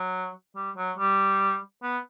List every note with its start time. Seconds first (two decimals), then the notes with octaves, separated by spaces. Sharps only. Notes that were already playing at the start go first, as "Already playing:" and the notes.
Already playing: F#3
0.56 G3
0.77 F#3
0.98 G3
1.83 B3